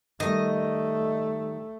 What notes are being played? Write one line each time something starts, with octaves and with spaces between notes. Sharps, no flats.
D#3 G3 A3 D#5